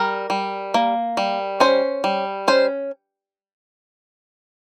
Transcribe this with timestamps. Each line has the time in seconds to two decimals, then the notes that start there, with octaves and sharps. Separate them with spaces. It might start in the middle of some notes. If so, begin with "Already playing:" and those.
Already playing: G3 A#4
0.30 G3
0.74 A#3
1.17 G3
1.60 C#4 C5
2.04 G3
2.48 C#4 C5